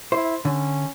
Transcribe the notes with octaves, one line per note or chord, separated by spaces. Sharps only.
E4 C5
D3 C#4